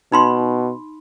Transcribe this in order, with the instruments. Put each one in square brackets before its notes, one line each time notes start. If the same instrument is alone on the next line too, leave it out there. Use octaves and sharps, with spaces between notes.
[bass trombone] B2 [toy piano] D#4 B5 C6